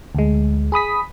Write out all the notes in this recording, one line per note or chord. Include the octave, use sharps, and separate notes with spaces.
D2 G#3
G#4 B5 D#6 B6